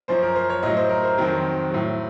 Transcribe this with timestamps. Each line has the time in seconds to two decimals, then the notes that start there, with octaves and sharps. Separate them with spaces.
0.08 F#2 F3 C5
0.23 A#4
0.35 C5
0.50 C#5
0.63 A2 F#3 D#5
0.76 C5
0.89 A#4
1.04 C5
1.13 A#4
1.18 F2 D#3 F#3 C5
1.71 A2 F#3